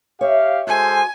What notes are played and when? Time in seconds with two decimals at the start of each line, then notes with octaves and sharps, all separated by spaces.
0.21 G4 C#5 E5 F5
0.67 G#3 F#4 A4 C5 G#5